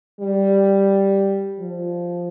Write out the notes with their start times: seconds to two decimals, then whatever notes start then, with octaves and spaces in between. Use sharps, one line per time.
0.20 G3
1.59 F3